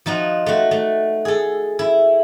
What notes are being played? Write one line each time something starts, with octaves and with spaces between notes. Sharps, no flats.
F3 D#4 F4 F#4
A3 F#4
A3
G#4 A4
E4